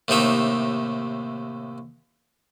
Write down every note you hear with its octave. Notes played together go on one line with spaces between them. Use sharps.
D#2 A2 C3 D#4 E5